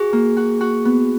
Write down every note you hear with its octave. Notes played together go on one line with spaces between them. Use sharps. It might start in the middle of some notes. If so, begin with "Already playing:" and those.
Already playing: F#4 G#4
A#3
F#4
F#4
B3